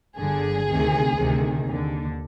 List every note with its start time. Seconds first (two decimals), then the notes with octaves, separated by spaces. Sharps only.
0.17 G1 G2 D3 G#4
0.67 D2 C3 D#3
1.16 D2 C3 D#3
1.66 D#2 D3